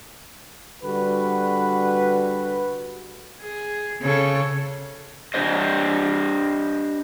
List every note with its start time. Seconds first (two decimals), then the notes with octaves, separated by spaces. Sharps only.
0.83 D3 G3 F#4 B4
3.42 G#4
4.01 C#3 A4 C#5
5.34 D4 G4 C5 D#5